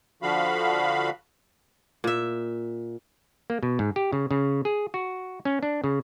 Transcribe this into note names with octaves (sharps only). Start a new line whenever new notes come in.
D3 F3 F#4 F5 B5
A#2 E5
A#3
B2
G#2
G4
C#3
C#3
G#4
F#4
C#4
D4
C#3